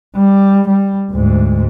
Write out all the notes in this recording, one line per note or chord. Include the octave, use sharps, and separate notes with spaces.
G3
G3
D2 G#2